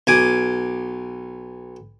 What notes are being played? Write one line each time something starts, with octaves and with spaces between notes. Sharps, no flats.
B1 G#5 D6